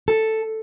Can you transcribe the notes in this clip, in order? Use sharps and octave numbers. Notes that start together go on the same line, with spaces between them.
A4